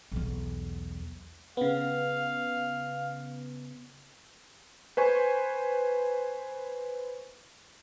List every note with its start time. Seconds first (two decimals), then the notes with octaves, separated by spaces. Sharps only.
0.12 B1 E2
1.57 C#3 B3 F5
4.97 B4 C5 G#5 C#6